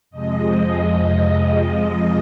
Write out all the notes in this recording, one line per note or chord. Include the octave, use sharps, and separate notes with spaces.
F2 C3 F3 G#3 D#5
D#5